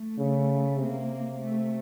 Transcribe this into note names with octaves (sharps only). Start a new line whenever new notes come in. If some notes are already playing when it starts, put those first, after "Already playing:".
Already playing: A3
C#3
C3 A#3
A3